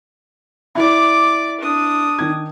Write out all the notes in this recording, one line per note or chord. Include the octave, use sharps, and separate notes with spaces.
E4 D5 D6
D4 D#6
D#3 G#6